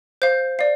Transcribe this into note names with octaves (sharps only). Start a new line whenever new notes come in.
C5 F5 G6
D5 F5